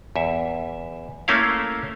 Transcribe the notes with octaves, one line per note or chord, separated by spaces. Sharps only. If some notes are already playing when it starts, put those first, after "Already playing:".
E2 E5
A3 A#3 C#4 E4 F5